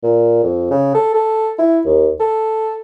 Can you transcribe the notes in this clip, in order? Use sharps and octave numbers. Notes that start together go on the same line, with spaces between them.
A#2
F2
C#3
A4
A4
E4
D#2
A4